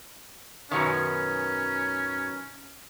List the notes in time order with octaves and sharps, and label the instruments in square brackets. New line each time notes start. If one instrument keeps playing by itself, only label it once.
[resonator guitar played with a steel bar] F#2 B2 D#3 [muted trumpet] C#4